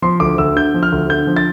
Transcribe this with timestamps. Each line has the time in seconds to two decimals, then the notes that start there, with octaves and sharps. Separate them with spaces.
0.02 F3 C6
0.20 D2 D6
0.38 D2 E6
0.56 D3 G6
0.74 F3
0.83 F6
0.92 D2
1.09 D3 G6
1.27 F3
1.36 A6